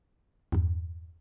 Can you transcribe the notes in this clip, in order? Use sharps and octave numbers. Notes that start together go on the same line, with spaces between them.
E2 G2